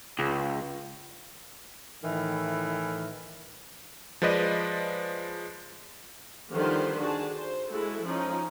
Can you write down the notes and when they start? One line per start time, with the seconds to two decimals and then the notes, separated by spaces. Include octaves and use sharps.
0.19 C#2
2.04 A2 D#3 E3
4.22 F3 G#3 B4 D5 D#5
6.53 D3 D#3 F3 G3 B4 C5
7.00 D4 F#4 G#4 A5
7.36 C5
7.70 G#3 E4 F#4 A4
8.04 F3 C#4 D#4